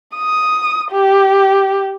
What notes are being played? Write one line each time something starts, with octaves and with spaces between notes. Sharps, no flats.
D#6
G4